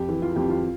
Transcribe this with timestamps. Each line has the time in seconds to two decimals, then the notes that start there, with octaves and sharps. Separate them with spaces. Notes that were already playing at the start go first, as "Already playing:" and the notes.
Already playing: F2 G4
0.09 E3
0.22 F4
0.36 F2 G4
0.49 F4